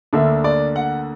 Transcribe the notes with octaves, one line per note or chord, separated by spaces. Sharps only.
D2 D3 A#3 D4 E5
D5
F#5